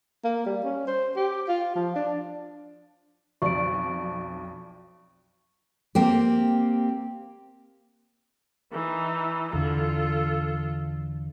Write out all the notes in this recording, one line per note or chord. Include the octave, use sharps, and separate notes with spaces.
A#3
G3
C#4
C5
G4
F4
F3
D4
B1 F2 D5 C#6 D7
A#3 C4 G4
E3 D#4
E2 D3 F4 A4